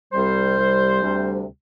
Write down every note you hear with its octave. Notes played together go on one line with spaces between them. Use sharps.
C2 C3 G3 C5
C2 C3 G3
D2 C3 G3